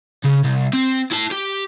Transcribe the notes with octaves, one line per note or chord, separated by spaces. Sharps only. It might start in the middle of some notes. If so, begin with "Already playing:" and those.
C#3
C2
C4
E4 A5
G4